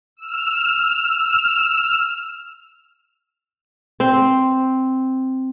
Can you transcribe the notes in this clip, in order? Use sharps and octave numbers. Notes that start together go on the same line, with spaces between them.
E6 F6
C4